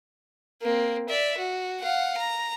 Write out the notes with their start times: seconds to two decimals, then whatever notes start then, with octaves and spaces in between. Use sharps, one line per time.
0.62 A#3 C4
1.09 D5 E5
1.38 F#4
1.81 F5 F#5
2.18 A#5